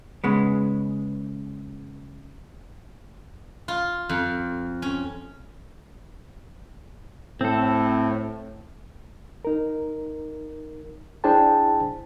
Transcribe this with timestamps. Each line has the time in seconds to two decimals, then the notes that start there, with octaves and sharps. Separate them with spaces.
0.24 C#3 G#3 B3
3.68 F4
4.09 F2
4.82 C#4
7.41 A2 C4 A4
9.45 D#4 A#4
11.24 D4 E4 G#4 C5 G5 A5